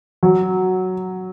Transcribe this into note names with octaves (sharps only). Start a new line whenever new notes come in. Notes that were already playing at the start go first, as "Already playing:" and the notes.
F#3